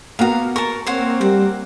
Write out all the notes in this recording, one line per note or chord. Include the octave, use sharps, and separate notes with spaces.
A#3 B3 F#4 F5 A#5
A#4 A5 C#6
A#3 C4 C5 C#5 F#5
G3 F#5